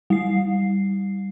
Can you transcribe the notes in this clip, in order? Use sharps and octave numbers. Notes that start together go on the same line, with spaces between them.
G3 C7